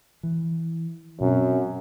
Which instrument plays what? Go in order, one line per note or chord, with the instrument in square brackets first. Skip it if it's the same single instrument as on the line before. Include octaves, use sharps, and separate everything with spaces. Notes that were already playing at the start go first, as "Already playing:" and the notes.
[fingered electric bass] E3
[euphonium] F#2 [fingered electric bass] B2 C4